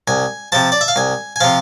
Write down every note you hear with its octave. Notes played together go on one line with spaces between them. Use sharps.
C2 G#5
C3 F3 A5
D5
E5
F5
C2 G#5
G#5
C3 F3 F5